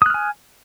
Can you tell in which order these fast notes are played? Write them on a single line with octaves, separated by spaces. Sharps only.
D#6 F#6 F6 G#5